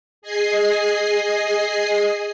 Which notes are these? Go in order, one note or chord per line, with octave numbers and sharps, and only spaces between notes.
G#4 D#5 G#5 C7